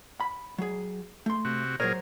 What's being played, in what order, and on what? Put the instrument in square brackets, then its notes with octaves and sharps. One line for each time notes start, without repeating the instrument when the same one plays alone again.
[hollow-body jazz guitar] B5
F#3 G#4
A3 C6
[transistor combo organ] C3 F#4
[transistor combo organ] A#2 G#4 A#4 [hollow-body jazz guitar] F#3 C5 C#5